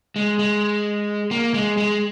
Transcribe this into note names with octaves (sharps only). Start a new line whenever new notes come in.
G#3
G#3
A#3
G#3
G#3